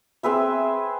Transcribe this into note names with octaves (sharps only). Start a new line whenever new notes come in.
C4 G#4 B4 E5